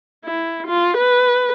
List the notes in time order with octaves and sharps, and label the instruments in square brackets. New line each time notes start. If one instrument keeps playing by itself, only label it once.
[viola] E4
F4
B4